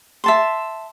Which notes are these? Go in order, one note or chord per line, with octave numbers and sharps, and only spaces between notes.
E5 A5 C6